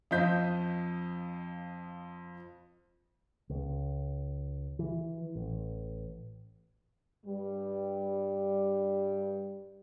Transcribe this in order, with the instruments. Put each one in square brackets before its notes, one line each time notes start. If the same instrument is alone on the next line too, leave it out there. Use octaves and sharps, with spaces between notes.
[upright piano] F2 F4 C5 D#5 G6 B6
[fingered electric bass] C#2
E3
A1
[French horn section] G2 G3